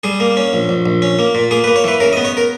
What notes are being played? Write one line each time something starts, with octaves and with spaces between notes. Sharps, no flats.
G3 G#4
A#3
C#4
A#1
A#1
A#1
C#4
A#3
A#2
A#3 G#4
B4
A#3
C#5
E3 B4
C#3 A#4
D#5
B3
C#5
A#4